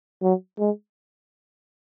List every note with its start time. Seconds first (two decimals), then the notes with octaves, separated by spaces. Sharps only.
0.22 F#3
0.59 G#3